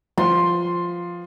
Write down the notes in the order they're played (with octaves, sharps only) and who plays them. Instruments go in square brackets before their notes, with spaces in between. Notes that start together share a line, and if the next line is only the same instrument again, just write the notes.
[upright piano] F3 [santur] C6